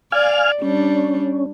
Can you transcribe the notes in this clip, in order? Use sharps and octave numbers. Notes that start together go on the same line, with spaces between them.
D5 F5 G#5 F6
G3 C#4 D4